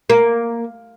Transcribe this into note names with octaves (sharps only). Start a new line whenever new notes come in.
A#3